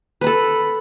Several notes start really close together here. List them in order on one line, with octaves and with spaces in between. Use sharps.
B4 B5 A4